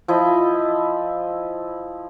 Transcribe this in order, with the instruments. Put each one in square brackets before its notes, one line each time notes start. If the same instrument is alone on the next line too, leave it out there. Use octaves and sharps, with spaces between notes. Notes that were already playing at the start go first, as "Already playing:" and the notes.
[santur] F3 E4 D#5